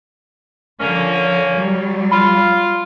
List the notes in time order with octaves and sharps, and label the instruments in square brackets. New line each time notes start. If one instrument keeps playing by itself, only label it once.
[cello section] D3 F3 [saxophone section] A#3 C#4
[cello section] F#3 G3
[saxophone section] F4 [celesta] B5